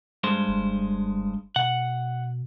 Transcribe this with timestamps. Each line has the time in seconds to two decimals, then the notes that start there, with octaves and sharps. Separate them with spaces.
0.24 G2 G#3 C5
0.48 F#1
1.56 B2 F#5